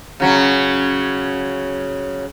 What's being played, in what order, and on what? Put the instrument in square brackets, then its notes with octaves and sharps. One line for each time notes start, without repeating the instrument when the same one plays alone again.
[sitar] C#3 F#3 C#4